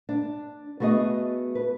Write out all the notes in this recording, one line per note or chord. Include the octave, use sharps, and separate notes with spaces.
D4
A3 B3 F#4 G#4 D#5
B4